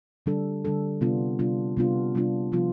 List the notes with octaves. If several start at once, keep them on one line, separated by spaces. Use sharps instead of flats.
D3 G3 D4 A4
D3 G3 D4 A4
C3 G3 B3 D4 F4
C3 G3 B3 D4 F4
C3 G3 B3 D4 F4
C3 G3 B3 D4 F4
C3 F3 B3 F4